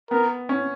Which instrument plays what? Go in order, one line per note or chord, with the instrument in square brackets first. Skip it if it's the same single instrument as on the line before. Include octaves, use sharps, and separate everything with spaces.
[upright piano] B3 [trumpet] A#4
[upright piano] C#4